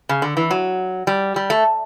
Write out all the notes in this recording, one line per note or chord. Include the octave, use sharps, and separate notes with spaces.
C#3
D3
E3
F#3
G3
G3
A3